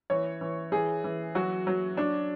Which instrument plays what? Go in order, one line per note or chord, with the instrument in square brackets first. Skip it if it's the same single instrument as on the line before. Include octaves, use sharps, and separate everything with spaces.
[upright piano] E3 C#5
E3
E3 G#4
E3
F#3 F#4
F#3
F#3 D4